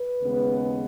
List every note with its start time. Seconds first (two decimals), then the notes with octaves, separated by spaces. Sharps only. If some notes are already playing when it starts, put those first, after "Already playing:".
Already playing: B4
0.21 D#2 C#3 G#3 B3